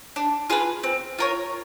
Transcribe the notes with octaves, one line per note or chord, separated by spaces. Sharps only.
D4
F4 G#4 B4
C4
F4 A#4 C#5